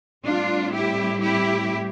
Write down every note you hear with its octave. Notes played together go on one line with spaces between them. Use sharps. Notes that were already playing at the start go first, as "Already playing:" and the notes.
A2 G3 C4 D4 F4
E4 G4
E4 G4